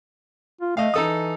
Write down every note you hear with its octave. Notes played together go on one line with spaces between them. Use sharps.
F4
A3 D#5 F5
E3 D#4 A4 D#6